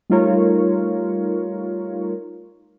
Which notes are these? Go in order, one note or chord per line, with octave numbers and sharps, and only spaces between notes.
G3 A3 D#4 F4 A#4 C#5